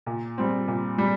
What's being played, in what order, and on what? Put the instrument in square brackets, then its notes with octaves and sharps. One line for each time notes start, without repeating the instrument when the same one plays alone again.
[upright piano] A#2
G3 C4
A#2
G3